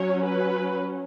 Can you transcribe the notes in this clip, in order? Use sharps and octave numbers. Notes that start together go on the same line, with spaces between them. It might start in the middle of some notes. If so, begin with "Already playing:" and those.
Already playing: F#3 C#4 C#5
B4